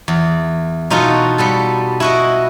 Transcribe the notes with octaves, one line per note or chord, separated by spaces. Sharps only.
E2
B2 D#4 F4 F#4 A4
G3 B3 A4
E4 F#4 D#5